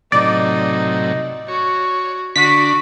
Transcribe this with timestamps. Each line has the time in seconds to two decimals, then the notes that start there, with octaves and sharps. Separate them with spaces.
0.12 A2 C3 F#3 D#4 D5
1.48 F#4 C#5
2.36 D3 D4 F#4 B6